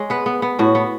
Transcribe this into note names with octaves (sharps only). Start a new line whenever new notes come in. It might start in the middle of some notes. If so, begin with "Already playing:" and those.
Already playing: G#3 C#5
B3 B4
B3
B3
A2 F#4
B3